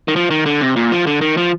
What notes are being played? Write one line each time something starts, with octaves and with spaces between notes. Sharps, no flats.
D#3
F3
D#3
D3
C3
A#2
F3
D3
D#3
F3